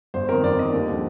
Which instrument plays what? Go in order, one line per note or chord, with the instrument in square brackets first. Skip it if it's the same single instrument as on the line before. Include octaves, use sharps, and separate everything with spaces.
[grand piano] G1 C5
F2 D#3 A#4
G1 D5
F2 D#3 D#5
D#2
D3 F3